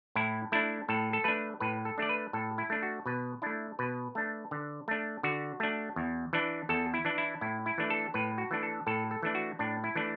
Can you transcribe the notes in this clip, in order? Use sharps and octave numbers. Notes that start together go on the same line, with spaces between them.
A2 E4
A3 D4 E4
A2 A4
A4
A3 D4 B4
A2 B4
A4
A3 D4 D5
B4
A2 A4
E4
A3 D4
F#4
B2 B4
A3 D4 E4
B2 B4
A3 D4
D3
A3 D4
D3 F#4
A3 D4
E2
E3 D4
E2 A4
E4
E3 D4
E4
A2 E4
E4
E3 A3 D4
A4
A2 B4
F#4
E3 A3 D4
A4
A2 A4
A4
E3 A3 D4
F#4
A2 D4
E4
E3 A3 D4